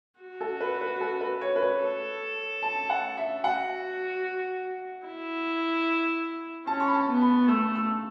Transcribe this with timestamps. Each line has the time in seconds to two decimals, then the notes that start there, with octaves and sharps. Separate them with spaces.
0.20 F#4
0.41 A4
0.61 B4
0.81 B4
1.01 A4
1.21 B4
1.41 C#5
1.56 B4
1.62 C#5
1.82 A4
2.62 A5
2.90 F#5
3.17 E5
3.43 F#4 F#5
5.06 E4
6.67 C#4 A5
6.80 C#6
6.88 B5
6.94 A5
7.09 B3
7.21 B5
7.48 A3 E6
7.75 E6